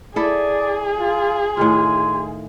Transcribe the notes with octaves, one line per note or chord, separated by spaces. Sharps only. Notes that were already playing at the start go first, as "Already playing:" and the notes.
E4 G#4 A4 D5
F4
A2 D#3 F4 G#5 C6